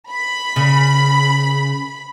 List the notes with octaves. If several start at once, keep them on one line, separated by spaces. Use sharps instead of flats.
B5
C#3